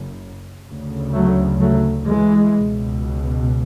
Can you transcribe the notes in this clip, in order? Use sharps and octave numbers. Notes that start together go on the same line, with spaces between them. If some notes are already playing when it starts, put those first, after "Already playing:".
Already playing: F#1 F#2 C#3
D2 C#3
F#3 A3
F#3 A3
E3 G#3
C#2 B2